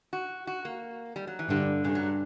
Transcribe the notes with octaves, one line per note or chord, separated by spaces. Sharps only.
F#4
F#4
A#3
G3
F#3
E3
G2 D3
G2 C#3
F#3